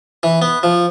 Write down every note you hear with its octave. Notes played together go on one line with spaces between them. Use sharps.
E3
B3
F3